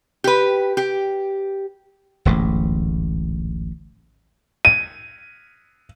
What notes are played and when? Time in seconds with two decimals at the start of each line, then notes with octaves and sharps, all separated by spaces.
0.24 G4 B4
0.77 G4
2.25 D1 A1 G#2
4.65 D#7